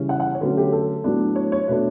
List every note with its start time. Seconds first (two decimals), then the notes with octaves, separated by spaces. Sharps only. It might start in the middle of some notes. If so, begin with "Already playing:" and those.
Already playing: C#3 E3 G3 C#4
0.09 F#5
0.20 F#5
0.35 C#5
0.41 D3 F#3 A3 C#4 B4
0.57 G4
0.72 A4
1.04 A2 F#3 B3 D4
1.36 C#5
1.52 C#5
1.68 B2 A3 D4 B4